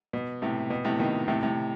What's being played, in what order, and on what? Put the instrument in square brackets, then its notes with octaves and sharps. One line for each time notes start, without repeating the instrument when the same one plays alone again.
[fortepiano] B2
A2 C3
B2
A2 C3
B2 D#3
A2 C3
A2 C3